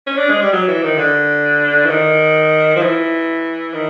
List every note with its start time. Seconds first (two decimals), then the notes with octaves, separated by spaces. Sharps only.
0.07 C#4
0.18 D4
0.30 G#3
0.41 G3
0.52 F#3
0.68 E3
0.83 D#3
0.98 D3
1.85 E3
1.89 D#3
2.76 F3
2.81 E3
3.74 D#3